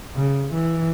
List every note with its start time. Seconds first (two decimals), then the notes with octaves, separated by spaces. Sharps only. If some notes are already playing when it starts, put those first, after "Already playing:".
0.15 C#3
0.53 E3